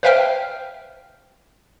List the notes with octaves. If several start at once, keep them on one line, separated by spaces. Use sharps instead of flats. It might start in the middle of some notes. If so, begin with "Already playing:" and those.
B4 C5 E5 F5 G5 F6